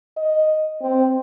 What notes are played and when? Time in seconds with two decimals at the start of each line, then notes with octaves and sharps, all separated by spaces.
0.17 D#5
0.81 C4